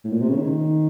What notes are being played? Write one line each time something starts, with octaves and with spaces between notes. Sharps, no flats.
A2
A#2
C3
C#3
D#3